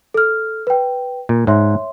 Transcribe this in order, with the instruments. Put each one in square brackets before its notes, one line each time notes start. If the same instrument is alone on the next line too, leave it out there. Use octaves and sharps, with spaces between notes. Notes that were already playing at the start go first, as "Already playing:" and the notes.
[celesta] A4 F6
B4 G5
[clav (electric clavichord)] A#2
[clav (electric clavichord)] G#2 [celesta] C#5 E5 C6